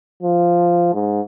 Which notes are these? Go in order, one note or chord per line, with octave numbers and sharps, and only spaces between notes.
F3
G#2